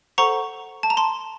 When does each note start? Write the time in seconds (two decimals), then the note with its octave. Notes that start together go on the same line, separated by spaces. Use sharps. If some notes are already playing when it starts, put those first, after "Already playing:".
0.18 A4 C5 F#5 A#5 C#6
0.83 A5
0.90 A#5
0.97 A5 C6